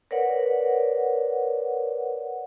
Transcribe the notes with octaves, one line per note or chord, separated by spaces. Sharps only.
A#4 B4 C#5 D5 F#5